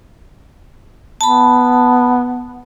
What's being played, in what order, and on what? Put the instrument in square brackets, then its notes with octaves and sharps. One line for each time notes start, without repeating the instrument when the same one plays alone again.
[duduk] B3 [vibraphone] A5 B5